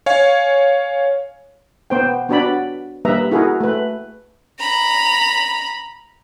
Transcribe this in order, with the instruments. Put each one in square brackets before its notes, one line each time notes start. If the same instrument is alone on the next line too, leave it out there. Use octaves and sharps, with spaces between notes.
[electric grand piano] C#5 F5 G#5
[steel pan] B3 C5 G5
B3 D4 F#4 D5 B5
G3 A#3 B4 E5 A#5
E4 F#4 G#4 A#4
A3 B4
[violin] A#5 B5